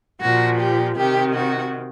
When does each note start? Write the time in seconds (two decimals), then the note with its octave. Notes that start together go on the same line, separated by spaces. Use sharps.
0.22 A#2 F3 F#4
0.60 G4
0.97 C3 D#3 G4
1.34 F#4